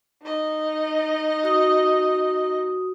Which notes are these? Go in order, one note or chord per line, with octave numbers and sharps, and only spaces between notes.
D#4 D#5
F#4 D#6